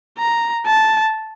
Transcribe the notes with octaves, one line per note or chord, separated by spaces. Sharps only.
A#5
A5